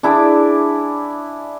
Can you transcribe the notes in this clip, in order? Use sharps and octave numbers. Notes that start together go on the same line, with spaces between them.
D4 E4 G#4 D5